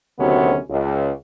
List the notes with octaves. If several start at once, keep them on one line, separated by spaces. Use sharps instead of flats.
D2 C3 D#3 F#3 B3 C#4
C#2